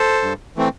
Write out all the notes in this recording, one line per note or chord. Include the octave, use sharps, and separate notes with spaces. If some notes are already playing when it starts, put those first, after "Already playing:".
Already playing: A4 C5
G2
E3 A3 C4